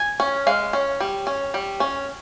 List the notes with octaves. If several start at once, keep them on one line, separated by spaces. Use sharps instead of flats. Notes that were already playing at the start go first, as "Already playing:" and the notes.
Already playing: G#5
C#4
G#3 F5
C#4
G3
C#4
G3
C#4